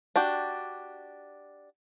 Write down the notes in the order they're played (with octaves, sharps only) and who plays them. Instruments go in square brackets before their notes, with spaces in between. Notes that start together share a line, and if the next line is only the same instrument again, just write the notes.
[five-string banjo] D4 F#4 G4